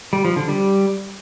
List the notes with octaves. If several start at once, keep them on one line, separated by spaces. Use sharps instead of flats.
G3
F3
D3
G3